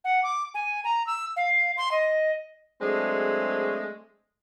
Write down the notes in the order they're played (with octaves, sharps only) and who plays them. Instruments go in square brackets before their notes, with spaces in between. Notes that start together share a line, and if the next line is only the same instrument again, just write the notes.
[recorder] F#5
D6
G#5
A#5
E6
F5
C6
D#5
[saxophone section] F#3 G#3 A3 C4 D4 G#4